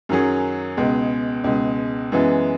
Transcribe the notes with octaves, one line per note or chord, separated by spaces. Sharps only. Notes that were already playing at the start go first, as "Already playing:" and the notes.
F#2 D#3 F#3 C#4 G#4
C#2 B2 G#3
C#2 B2 G#3
F#2 E3 G#3 B3